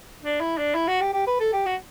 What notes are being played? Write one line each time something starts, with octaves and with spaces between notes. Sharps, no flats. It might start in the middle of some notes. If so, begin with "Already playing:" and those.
D4
E4
D4
E4
F#4
G4
G4
B4
A4
G4
F#4